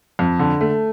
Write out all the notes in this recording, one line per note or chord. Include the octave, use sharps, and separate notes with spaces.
F2
D3
A3